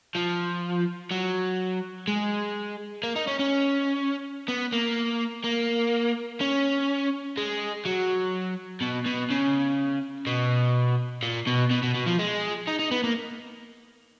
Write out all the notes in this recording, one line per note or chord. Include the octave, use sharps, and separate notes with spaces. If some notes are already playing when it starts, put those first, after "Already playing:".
F3
F#3
G#3
A#3
D#4
C#4
C#4
B3
A#3
A#3
C#4
G#3
F#3
B2
B2
C#3
B2
A#2
B2
B2
B2
B2
F3
G#3
D#4
D#4
B3
A#3